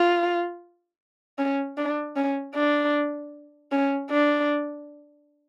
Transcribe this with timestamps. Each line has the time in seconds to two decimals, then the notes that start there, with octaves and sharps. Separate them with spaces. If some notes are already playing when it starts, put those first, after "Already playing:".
Already playing: F4
1.38 C#4
1.77 D4
2.16 C#4
2.54 D4
3.72 C#4
4.10 D4